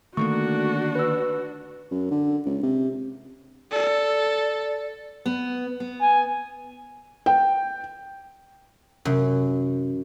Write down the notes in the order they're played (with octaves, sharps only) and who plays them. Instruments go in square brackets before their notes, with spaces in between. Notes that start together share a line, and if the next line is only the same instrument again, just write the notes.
[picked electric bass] D3 D#3 A#3 [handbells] A3 C#6 [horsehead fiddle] D4 F#4
[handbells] B4 E6
[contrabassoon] F#2
D3
C#2
C3
[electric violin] A4 [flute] D5
[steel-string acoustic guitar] B3
B3
[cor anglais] G#5
[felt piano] G5
[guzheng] F#2 [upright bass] C3 E3